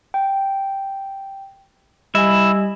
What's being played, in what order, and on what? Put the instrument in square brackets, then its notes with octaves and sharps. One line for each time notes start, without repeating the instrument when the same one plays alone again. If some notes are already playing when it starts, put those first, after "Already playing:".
[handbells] G5
[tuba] G3 [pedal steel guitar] E4 E5 [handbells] D#5 G#5